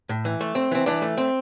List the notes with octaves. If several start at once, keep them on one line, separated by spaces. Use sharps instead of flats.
A2
E3
A3
C4
E3 C4
E3 D4
A3
C4